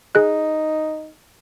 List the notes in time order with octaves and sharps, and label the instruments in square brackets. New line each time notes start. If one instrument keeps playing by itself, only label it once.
[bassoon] D#4 [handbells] G#4 F#6